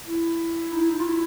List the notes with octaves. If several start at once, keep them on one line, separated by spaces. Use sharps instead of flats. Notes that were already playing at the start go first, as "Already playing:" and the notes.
E4
D#4
E4
D#4
F4
E4